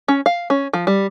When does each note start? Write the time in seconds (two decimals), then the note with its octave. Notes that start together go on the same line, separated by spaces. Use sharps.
0.08 C#4
0.26 F5
0.50 C#4
0.74 F3
0.87 G3